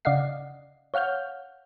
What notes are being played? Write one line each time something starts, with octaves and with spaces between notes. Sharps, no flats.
C#3 D5 D#5 F5 F#5 C7
C#5 F5 F#5 F6 G6